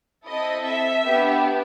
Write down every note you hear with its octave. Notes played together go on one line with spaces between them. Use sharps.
C4 E4 A4 D#5
E5
B3 D4 G4